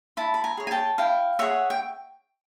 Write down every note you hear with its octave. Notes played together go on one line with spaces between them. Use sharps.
E4 A5 B5
B5
G#5 A#5
G#4 C#5
G#5
G5 A5
E4 F5 G5
G#4 C#5 E5 F#5
G5